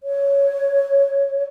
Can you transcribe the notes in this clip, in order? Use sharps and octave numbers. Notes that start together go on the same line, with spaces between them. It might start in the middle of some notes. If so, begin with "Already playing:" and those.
C#5